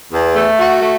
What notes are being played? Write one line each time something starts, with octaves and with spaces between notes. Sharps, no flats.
E2
A3
F#4
A3